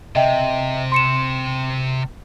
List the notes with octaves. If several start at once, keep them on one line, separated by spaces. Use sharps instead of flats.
C3 D#5 E5 G5
C6 C#7 E7